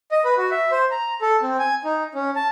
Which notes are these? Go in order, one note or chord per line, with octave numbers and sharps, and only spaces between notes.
D#5
B4
F#4
E5
C5
A#5
A4
C4
G#5
D#4
C#4
A5